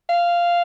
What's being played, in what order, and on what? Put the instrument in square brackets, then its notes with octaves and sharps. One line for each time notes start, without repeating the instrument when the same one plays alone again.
[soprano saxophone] F5